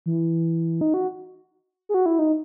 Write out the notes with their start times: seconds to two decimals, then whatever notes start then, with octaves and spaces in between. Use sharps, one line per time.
0.06 E3
0.81 D#4
0.94 F#4
1.89 G#4
1.94 F#4
2.06 E4
2.19 D#4